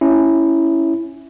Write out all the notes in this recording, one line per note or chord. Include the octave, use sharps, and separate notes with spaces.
C#4 E4